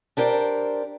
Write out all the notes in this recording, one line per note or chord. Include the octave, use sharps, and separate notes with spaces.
D4 G4 A#4 C5 D5